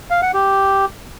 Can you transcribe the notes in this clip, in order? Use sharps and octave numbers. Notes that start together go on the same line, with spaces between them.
F5
F#5
G4